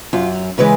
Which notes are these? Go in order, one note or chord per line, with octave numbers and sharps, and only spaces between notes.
F#2 F4
C#3 E3 G#3 B4